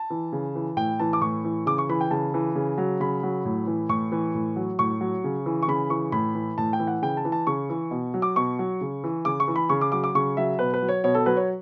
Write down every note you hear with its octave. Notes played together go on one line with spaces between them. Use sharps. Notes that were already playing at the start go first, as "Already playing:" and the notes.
Already playing: A5
E3
C#3
E3
A2 G5
E3 A5
D6
A2 C#6
E3
C#3 D6
C#6
E3 B5
G5
C#3 A5
E3
C#3
F#3
C#3 B5
F#3
A2
E3
A2 C#6
E3
A2
F#3
A2 C#6
F#3
C#3
E3
C#6
C#3 B5
E3 C#6
A2 B5
E3
A2 A5
G5
E3
F#5
C#3 G5
A5
E3
A5
C#3 C#6
E3
B2
F#3
D6
B2 C#6
F#3
C#3
E3
C#3 D6
C#6
E3
B5
C#3 C#6
D6
F#3 D6
D6
C#3 C#6
F#3 E5
B2 B4
B4
F#3
C#5
B2 C#5
A4
F#3 B4
C#5